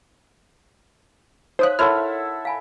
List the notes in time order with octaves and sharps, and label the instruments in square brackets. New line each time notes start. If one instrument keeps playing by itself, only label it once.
[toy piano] D#4 C#5 F5 [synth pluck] C5 D#6 F#6 [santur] E5
[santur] E4 A4 F#5 [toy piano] A#4 C#5 C6 [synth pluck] F6
[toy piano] F5 G#5 B5